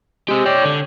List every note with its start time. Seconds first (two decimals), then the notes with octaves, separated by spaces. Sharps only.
0.28 G#3 G4 C5
0.46 C#5 D5 G5
0.65 D3